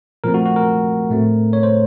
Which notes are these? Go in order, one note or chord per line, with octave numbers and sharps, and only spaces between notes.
A#2 F3 A3 C4 A#4
F#4
F#4
A#4
A2 A3 C4
C#5
C5